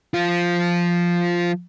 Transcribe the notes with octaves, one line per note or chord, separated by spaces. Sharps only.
F3 F4